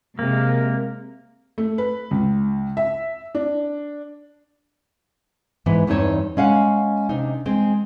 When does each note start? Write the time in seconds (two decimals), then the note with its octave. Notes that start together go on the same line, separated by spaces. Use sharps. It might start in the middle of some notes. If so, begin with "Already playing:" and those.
0.19 C3 G#3 A#3
1.58 A3
1.78 B4
2.11 C#2
2.77 E5
3.35 D4
5.66 G#2 E3 B3
5.87 E2 G2 C4 D#4 C#5 A5
6.37 G#3 C#4 F5 F#5
7.09 C3 D4 D#4
7.46 G#3 C4